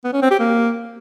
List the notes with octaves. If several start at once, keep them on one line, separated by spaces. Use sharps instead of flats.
B3
C#4
C4
G4
A#3